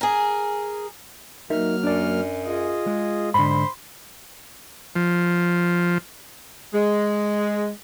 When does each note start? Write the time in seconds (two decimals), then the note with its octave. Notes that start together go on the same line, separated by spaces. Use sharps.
0.01 G#4 A#4
1.50 F#3 A#3 D#4 A#4 E5 F6
1.83 F#2 D4 D5
2.45 F4 G#4 D#5
2.87 G#3
3.34 G#2 D3 C5 B5
4.96 F3
6.74 G#3